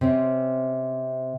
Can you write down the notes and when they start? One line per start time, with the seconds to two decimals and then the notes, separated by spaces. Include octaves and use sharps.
0.01 C3 C4 C#4